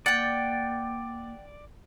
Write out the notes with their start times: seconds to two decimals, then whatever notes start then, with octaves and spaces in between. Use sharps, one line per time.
0.06 A#3 D5 F#5 G5 A6